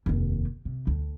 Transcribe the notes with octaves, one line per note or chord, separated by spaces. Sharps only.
F1 D#2
C3
D2